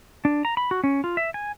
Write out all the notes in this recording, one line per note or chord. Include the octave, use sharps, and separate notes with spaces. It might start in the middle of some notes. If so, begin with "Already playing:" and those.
D4
A#5
B5
F#4
C#4
F4
E5
G#5